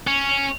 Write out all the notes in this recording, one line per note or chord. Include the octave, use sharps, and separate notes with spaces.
C#4